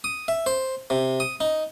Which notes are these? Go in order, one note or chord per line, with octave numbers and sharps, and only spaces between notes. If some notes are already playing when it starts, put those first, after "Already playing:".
D#6
E5
C5
C3
D#6
D#4